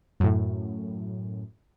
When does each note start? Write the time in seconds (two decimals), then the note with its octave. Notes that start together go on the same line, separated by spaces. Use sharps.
0.20 F#2 A2